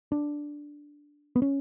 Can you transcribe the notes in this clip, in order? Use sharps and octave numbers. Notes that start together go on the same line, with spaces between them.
D4
B3
C#4